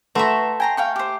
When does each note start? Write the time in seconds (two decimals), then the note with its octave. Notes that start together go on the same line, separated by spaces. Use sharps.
0.15 A3 F#4 B4 E5 A#5 C6 C#6
0.60 G5 G#5 A#5 C6
0.77 F5 G5 C#6
0.96 G4 C5